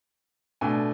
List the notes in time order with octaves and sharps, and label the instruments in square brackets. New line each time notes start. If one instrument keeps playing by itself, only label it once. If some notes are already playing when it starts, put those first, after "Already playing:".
[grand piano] B2 A3 D4 G#5